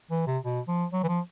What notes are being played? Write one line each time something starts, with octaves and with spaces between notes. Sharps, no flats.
E3
C3
B2
F3
F#3
E3
F3